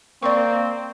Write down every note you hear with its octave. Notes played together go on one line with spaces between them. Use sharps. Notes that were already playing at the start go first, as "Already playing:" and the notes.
A#3 C4 D5 C#6